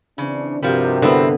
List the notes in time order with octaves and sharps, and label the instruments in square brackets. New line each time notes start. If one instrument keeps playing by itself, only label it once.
[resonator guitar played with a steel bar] C#3 [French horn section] E3 C4 D4
[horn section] G2 C3 [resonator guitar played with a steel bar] F3 G3 [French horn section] F#4 A#4
[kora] D3 B3 [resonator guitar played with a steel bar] C4 E4